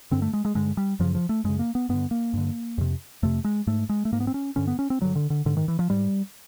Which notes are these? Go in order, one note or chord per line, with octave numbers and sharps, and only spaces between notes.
G2 D3 C4
A3
G#3
G#3
G2 D3 G#3
G3
F#2 C#3 F3
F3
A3
F#2 C#3 G#3
A#3
B3
G2 D3 B3
A#3
G2 D3
F2 C3
F2 C3 A3
G#3
G#2 A3
G#3
A3
G#2 A#3
B3
C4
C#4
G2 D3 C#4
B3
C#4
C4
G2 D3 F#3
D3
D3
G#2 D3
D#3
E3
F3
G#2 G3